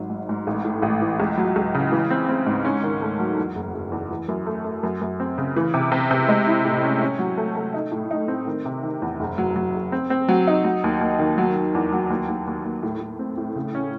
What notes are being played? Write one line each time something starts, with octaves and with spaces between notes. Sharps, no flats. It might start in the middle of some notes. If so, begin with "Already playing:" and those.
Already playing: G#1 F#3
G#2
G#2
A1
A2
A1
E3
C#2
F#3
C#2
C#3
E3
C4
C4
G#2
C#4
D#3
A3
F#3
E2
F#1
F#1
E2
E3
F#2
A3
A3
F#2
F#2
C4
C#3
E3
C3
C3
C3
G#3
E4
A2
C#4
C#4
F#3
A3
A3
D#4
A2
D#4
C4
D#3
C3
D#3
E2
F#1
F#3
F#3
F#1
C4
C4
F#3
D#4
F#3
D#2
D#2
D#3
F#3
F#3
E2
F#3
D#2
D#2
D#2
D#2
A2
A2
C4
A2
C#3
C#4